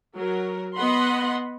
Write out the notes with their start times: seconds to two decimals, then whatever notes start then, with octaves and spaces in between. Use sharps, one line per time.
0.17 F#3 A#4
0.76 B3 D#5 F#5 B5 C6